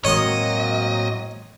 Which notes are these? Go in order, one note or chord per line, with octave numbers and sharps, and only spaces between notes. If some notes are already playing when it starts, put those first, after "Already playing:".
A2 F#3 G#3 A#3 C4 C#5 D#5 D#6